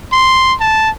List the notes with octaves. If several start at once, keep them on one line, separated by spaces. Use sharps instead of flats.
C6
A5